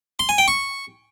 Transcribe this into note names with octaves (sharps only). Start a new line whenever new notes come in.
C6
G#5
G5
C#6